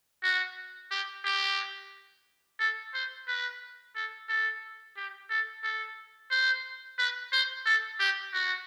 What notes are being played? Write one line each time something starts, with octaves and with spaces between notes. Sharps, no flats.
F#4
G4
G4
A4
C5
B4
A4
A4
G4
A4
A4
C5
B4
C5
A4
G4
F#4